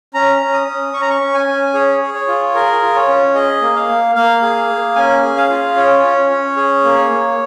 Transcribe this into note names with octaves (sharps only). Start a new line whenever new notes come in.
C#4 A#5
C#4
D#6
C#4
C#4 C#6
A#5
C#6
C#4
G#5
C#4
G#4 C#5
G#4
C#5
F4
G#4 A#4
F4
C#5
C#4
G#4 D#5
A#3
F5
A#3
A#3 F5
G#4
A#3
C#4 G#5
G#4
F5
F4
C#4 C#5
C#4
C#4
G#4
A#3
A#3